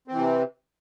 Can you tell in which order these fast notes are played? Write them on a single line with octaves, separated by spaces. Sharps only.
C4 E3 C3